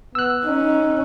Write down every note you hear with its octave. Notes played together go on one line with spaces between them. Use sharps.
B3 E6 F#6
C#4 D#4